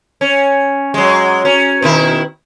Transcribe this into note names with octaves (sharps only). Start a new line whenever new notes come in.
C#4
F#3 G#3
C#4
B2 D#3 E4